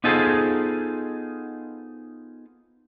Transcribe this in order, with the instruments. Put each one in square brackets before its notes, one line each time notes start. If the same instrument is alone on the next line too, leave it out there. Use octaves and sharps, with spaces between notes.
[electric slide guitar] B3 D#4 F4 G#4 A4 C5